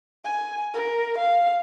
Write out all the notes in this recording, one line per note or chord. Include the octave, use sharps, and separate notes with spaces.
G#5
A#4
F5